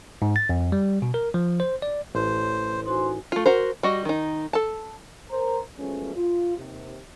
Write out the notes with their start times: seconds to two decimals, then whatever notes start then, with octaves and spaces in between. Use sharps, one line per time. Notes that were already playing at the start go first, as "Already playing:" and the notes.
0.22 G#2
0.36 A6
0.49 F2
0.72 G3
1.02 B2
1.14 A#4
1.34 F3
1.60 C5
1.82 D5
2.15 A1 A3 C5
2.86 D#4 F#4 C5 G#5
3.32 A3 F4
3.46 F#4 A#4 C5
3.83 G3 F#4 D#5
4.05 D#3 D#4
4.53 A4 A5
5.30 A#4 C5 A#5
5.77 F3 F#3 G#3 A3 B3 C#4
6.16 F4
6.57 D#2 C3